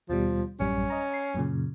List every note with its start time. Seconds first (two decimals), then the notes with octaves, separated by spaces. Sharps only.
0.09 D#2 B2 F3 G3
0.60 A1 F#2 G3 C#4
0.90 D#5 A#5
1.14 C7
1.35 F#2 A#2 C#3